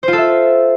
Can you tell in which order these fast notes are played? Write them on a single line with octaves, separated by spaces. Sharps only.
C5 F4 A4 E5